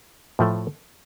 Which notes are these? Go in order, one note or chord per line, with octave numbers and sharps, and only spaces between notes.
A2 F3 A3